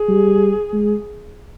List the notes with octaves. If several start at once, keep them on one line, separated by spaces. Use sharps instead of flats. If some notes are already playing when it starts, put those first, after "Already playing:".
Already playing: G#4
G3
G#3